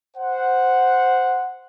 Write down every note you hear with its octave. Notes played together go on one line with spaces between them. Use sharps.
C5 F#5